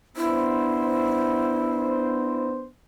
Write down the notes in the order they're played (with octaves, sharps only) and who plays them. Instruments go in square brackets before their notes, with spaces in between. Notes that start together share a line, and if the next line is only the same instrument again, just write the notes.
[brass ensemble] B3 D4 C5 [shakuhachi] E4